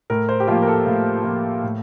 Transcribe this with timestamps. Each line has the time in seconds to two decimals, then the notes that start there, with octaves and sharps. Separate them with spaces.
0.10 A2 A#4
0.29 C5
0.40 G4
0.48 F3 A#3 F4
0.62 A#4
0.68 A4
0.86 A2 F5
1.24 F3 A#3
1.63 A2